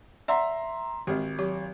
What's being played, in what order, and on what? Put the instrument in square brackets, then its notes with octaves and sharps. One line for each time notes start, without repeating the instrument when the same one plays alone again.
[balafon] D5 F#5 [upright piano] E5 A#5 C6
[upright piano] G#1 [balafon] G#3 C4 G4
[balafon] F#3 G4 D6